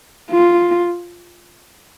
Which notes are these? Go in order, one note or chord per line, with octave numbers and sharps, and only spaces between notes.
F4